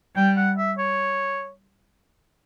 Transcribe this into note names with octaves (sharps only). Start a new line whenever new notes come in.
G3 G5
F#5
E5
C#5